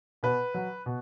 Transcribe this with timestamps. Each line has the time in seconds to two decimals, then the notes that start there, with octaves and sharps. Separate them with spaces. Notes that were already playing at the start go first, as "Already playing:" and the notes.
0.23 B2 B4
0.54 F#3
0.86 B2